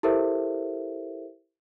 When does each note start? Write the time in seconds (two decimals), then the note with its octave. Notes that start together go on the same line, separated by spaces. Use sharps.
0.03 E4 G4 A4 A#4 C5 E5